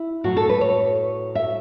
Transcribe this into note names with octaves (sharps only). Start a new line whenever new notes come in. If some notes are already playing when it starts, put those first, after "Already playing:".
Already playing: E4
A2 F#3 F#4
A4
B4
C#5
E5